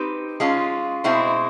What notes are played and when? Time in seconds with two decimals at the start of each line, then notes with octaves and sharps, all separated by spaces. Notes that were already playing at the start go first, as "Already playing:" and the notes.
Already playing: C4 D#4 G4 B4
0.40 G#3 C#4 F4
1.04 B2 G#3 C4 E4